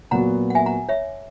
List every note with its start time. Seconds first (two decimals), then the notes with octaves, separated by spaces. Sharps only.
0.11 A#2 F#3 B3 F#4 F#5 A#5
0.50 F#5
0.55 E5 G#5
0.66 F#5 A#5
0.89 C#5 E5